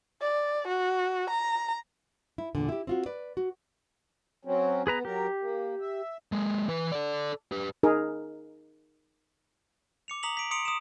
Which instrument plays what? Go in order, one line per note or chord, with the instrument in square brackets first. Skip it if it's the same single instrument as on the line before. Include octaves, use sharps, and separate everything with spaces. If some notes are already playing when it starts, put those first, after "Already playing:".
[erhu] D5
F#4
A#5
[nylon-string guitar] E4
E2 A#2 D3
E4 G4
C4 F4 F#4
B4 D5
F#4
[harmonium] F#3 C4 C#4
[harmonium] B3 [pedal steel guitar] G#4 B4 A#5
[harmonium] F#3 A#4 [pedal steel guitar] G4
[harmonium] A#3
E5
[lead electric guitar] G#3 A#3
E3 B4
A4 D5
G4 B4
[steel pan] D#4 G#4 A#4
[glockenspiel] D6 C#7 F7
A#5 D#6 B6 F7 F#7
B6 D7
C6 D#6 C#7 D7 F7
D#6 D7 E7